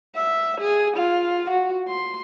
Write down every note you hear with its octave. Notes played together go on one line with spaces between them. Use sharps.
E5
G#4
F4
F#4
C6